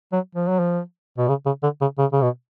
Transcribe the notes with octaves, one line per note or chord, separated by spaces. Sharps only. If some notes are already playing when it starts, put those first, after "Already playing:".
F#3
F3
F#3
F3
B2
C#3
C#3
D3
C#3
C#3
C#3
B2